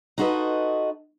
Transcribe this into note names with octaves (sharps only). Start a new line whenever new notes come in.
D#4 F4 F#4 A4 B4 D#5